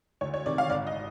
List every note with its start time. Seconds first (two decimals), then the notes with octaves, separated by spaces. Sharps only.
0.21 D2 C#5
0.34 C#5
0.46 C3 D#3 D5
0.58 F5
0.70 G#1 D5
0.87 D#5